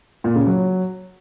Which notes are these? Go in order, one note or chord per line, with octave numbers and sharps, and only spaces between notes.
A#2
C#3
F#3